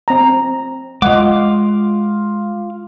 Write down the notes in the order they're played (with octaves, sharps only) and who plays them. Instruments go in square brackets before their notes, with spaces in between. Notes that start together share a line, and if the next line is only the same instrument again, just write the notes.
[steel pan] C4 A#5
[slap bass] G#3 [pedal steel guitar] F4 D6 [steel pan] D#5 F#5